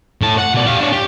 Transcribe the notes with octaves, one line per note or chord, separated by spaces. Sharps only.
A2 A5
F#5
B2 D5
G4 F5
D4 C#5
G4